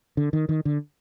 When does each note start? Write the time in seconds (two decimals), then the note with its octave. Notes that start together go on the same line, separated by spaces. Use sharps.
0.17 D3
0.33 D#3
0.49 D#3
0.65 D3